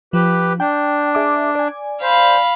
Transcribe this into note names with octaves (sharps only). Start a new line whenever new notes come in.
F3 G4 B4
D4 G5
G#4 E5 D6
D5 G#5
C5 F5 B5